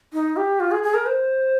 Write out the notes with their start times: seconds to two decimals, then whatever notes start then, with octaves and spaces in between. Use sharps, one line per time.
0.13 D#4
0.36 G4
0.60 F4
0.71 G#4
0.83 G#4
0.94 A#4
1.06 C5